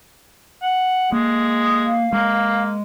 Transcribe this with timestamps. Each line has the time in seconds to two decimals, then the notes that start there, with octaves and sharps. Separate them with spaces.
0.62 F#5
1.12 G#3 A#3
1.47 D#6
1.87 F5
2.13 G#3 A#3